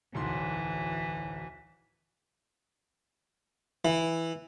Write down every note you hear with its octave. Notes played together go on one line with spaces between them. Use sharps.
D1 B1 E3 C6
E3